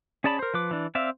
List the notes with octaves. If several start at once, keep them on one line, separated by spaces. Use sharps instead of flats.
C#4 G#4 D5 A5 B5
A#4 C5
F3 B4 D6
E3 D4
C4 D5 E5 F5